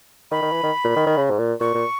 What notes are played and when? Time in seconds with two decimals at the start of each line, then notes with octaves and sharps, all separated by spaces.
0.31 D#3 B5
0.42 D#3
0.52 E3
0.63 D#3
0.84 A#2
0.96 D#3
1.06 D#3
1.17 C#3
1.30 G#2
1.39 A#2
1.60 A#2 C#6
1.75 A#2